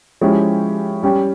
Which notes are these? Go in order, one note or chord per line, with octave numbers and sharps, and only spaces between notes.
F3 G#3 C#4 E4 G4
G3 C#4 G4